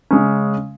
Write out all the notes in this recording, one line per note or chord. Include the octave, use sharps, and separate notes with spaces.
C#3 G#3 C#4